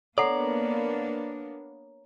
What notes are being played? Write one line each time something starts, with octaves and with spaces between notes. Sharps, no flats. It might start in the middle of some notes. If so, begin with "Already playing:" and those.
A#3 B3 D4 A4 C#5 D5 F#5 A#5